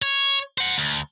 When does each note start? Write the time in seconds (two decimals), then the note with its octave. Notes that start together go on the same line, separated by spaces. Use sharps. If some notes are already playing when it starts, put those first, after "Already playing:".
0.02 C#5
0.58 C5 F#5
0.78 D2